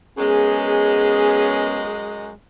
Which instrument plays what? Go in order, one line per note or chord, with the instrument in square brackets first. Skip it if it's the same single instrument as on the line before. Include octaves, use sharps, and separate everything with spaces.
[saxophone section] F#2 G#3 [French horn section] B3 C#4 G#4